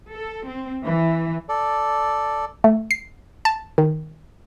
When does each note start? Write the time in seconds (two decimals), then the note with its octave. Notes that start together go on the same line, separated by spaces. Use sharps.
0.11 A4
0.47 C4
0.84 E3
1.49 A4 D5
2.64 A3
2.91 C7
3.45 A5
3.78 D#3